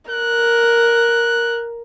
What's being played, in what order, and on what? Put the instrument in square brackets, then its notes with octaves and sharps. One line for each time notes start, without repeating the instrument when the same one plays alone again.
[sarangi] A#4 [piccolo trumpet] F#6